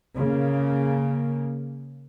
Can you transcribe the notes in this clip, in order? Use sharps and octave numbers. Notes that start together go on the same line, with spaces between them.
C#3 A#3